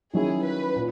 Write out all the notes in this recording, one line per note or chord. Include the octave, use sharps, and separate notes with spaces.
D#3 F#3 C#4 E4 G#4
B4
A#2